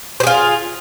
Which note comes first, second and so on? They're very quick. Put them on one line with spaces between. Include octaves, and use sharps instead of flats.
C5 G#4 F4